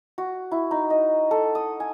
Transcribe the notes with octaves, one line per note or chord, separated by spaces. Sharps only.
F#4
E4
D#4
D#5
A4
D#6
G#5